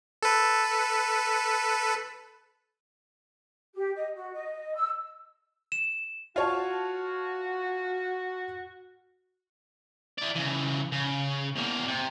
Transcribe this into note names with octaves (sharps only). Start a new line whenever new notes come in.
A4 B4
G4
D#5
F#4
D#5
E6
E7
F4 F#4 C#5 A5
E4 D5
C#3 E3
C#3
E2 A#3
C3